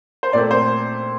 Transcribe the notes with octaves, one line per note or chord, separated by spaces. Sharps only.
C5
A#2 A3 C4 D5
C5